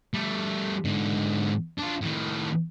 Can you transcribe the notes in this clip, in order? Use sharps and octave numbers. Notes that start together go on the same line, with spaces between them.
G3 A3
G#2 D3
D4 F4
A2 D#3